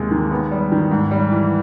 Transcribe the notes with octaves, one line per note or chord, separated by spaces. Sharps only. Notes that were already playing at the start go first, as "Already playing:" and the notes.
Already playing: D#2 C3 G#3
D#3
B3
G3
D#3
G#2
G3
E3